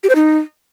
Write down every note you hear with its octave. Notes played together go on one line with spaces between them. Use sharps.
G4
C5
D#4